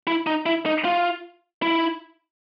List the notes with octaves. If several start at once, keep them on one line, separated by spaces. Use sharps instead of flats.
E4
D#4
E4
D#4
F4
E4